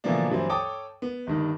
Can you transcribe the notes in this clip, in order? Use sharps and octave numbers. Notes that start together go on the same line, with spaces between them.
B2 D3 E3 F3 A#3 D4
G2 E3 F#3 C4
A4 C#5 G5 A5 D6 D#6
B3
G1 G2 D#3